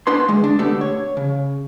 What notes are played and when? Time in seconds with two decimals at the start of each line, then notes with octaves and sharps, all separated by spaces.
0.07 B3 D4 B4 C6
0.28 D2 G#3
0.44 D4
0.59 B2 D3 A3 B3 G4 A4
0.81 C#5
1.17 C#3